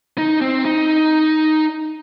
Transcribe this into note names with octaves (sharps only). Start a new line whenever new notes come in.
D#4
C4
D#4